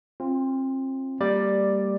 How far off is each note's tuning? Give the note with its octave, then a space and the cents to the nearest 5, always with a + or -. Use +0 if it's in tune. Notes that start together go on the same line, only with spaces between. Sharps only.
C4 +30 F4 +0
G3 +0 A#3 -30 D5 +10